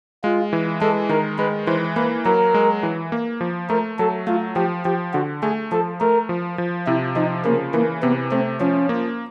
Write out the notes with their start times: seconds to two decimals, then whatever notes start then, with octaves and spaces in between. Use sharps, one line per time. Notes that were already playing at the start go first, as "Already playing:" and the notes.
0.24 G#3 F4
0.53 E3
0.81 G#3 A4
1.09 D#3 A#4
1.38 G#3 B4
1.67 E3 C5
1.96 A#3 B4
2.25 F#3 A#4
2.54 G#3
2.83 E3
3.12 A#3
3.41 F3
3.69 A3 A#4
3.99 F#3 A4
4.27 A3 F4
4.56 F3 G4
4.85 F3 G4
5.13 D3 F#4
5.43 A3 G#4
5.72 F3 A4
6.00 A3 A#4
6.29 F3
6.58 F3
6.87 C3 E4
7.16 F3 D#4
7.45 C#3 A#3
7.74 E3 A#3
8.03 C3 B3
8.32 A3 C4
8.60 F3 C#4
8.89 A#3